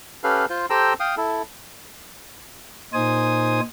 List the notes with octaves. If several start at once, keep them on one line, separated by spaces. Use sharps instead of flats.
C#4 G4 A4 B4 F5
F4 C5
G4 A4 C5 G5 A#5 E6
F5 G5 D#6
E4 A4
A#2 D#4 C5 G#5 D#6